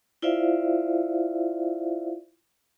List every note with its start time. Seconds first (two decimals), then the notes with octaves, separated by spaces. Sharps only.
0.22 E4 F4 C5 D5 E5 F5